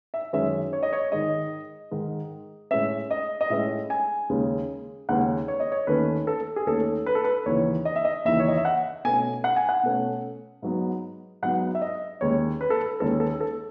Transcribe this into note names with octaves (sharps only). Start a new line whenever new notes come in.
E5
F#2 D#3 G#3 C#4 E5
C#5
D#5
C#5
G#2 D#3 G#3 D#5
G#2 D#3 G#3
A2 G#3 C#4 E5
D#5
D#5
A2 G#3 C#4 E5
G#5
D#2 C#3 G#3 C#4
D#2 C#3 G#3 C#4 F#5
C#5
D#5
C#5
D#2 D#3 A3 C#4 B4
A4
G#4
D#2 D#3 A3 C#4 A4
B4
A4
B4
D#2 C#3 E3 C#5
D#5
E5
D#5
D#2 C#3 E3 E5
C#5
D#5
E5
F#5
B2 A3 C#4 G#5
F#5
G#5
F#5
B2 A3 C#4
G#2 F#3 B3
G#2 F#3 B3 F#5
E5
D#5
D#2 D#3 G#3 C#4 C#5
B4
A4
B4
D#2 D#3 G#3 C#4 A4
A4
A4